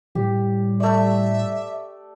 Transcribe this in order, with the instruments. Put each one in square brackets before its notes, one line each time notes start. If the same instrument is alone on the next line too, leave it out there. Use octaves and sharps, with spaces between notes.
[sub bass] A2 [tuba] G3 [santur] G4
[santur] A3 D5 [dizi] E5